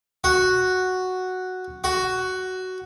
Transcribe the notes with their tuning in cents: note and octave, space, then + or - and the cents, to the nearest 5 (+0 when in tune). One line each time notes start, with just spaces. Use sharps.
F#4 +0
F#4 +10